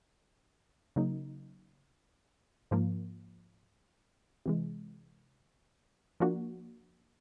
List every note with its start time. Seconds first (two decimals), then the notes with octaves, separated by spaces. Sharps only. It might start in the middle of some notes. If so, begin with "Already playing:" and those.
0.96 C#3 F#3 A#3 D#4
2.71 G#2 F3 A#3
4.46 C3 E3 G#3
6.20 F3 A#3 D4 F#4